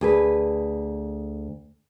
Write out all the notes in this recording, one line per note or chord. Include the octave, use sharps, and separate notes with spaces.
D2 G#4 B4